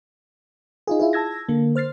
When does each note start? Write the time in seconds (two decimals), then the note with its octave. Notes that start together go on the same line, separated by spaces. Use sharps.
0.87 D#4 F4 G#4
0.99 E4 F4 G#4
1.13 A5 E6 G#6 A#6
1.49 D3 A#3
1.75 C5 F6 A6 C7